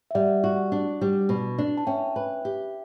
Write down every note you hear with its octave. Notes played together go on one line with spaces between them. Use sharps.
E5
G3 D5 F#5
F#4
D4
G3
B2
D4
A5
C#4 E5 G5
B4
G4